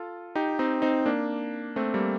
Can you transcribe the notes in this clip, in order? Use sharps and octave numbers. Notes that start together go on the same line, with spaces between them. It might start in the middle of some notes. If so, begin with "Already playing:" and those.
Already playing: F4 A4
D#4 G4
C4 D#4
C4 D#4
A#3 D4
A3 C4
G3 A#3